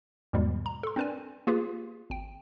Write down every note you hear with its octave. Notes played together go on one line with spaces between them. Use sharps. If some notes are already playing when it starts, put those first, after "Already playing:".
E2 G#2 B2 D#3 G3 G#3
A#5
A4 C6
C4 D4 A#4 B4 D5 G#5
A#3 F4 G4 G#4 B4
G#1 G5